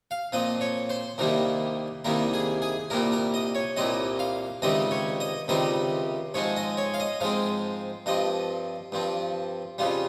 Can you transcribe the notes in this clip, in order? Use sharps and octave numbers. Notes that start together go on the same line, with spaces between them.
F5
A#2 F3 C4 D#5
C#5
C5
C2 C3 D#3 G3 A#3 A#4
C2 C3 D#3 G3 A#3 A#4
G#4
G#4
C2 A#2 G3 C4 A#4
A#4
D#5
C#5
C2 A#2 G3 C4 D#5
F5
C#2 C3 D#3 G3 C4 D#5
C#5
D#5
C#2 C3 D#3 G3 C4 D#5
G#2 F3 G#3 C4 C#5
D#5
C#5
F5
D#5
G#2 F3 G#3 C4 F5
G2 F3 C4 D#5
G2 F3 C4
F2 C#3 G3 F4